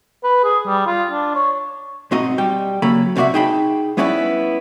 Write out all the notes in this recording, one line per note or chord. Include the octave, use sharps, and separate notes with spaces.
B4
G#4
G3
F4
D4
C#5
B1 G#2 C4 F#4 D#5 A#5
G3 G5
C#3 F#3 A#3 A4 A#5 B5
C#2 C3 C4 F#4 D5 E5
D#4 G#4 G5 A5 B5
G3 B3 C#4 E4 B4 D5